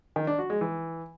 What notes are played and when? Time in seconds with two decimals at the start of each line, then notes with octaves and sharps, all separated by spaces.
0.16 D#3
0.27 D4
0.39 F#4
0.50 G#3
0.61 E3